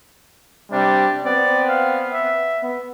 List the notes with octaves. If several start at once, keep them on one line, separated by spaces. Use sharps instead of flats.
C3 G3 D4
B3 C4 D5
F5
E5
B3